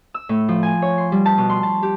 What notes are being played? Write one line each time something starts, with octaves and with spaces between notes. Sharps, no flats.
E6
A2
F3
G#5
C#5
C6
G3
A5
B2
C6
A5
G4